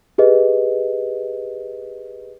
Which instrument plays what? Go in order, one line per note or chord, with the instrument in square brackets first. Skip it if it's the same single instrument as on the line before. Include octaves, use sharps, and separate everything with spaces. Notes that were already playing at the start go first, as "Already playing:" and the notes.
[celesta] G4 G#4 B4 D#5